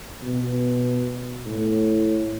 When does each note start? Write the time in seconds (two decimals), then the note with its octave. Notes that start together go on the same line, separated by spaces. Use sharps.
0.23 B2
1.46 A2